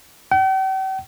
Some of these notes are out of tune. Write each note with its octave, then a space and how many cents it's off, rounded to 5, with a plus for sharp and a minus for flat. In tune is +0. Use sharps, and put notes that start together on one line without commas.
G5 -45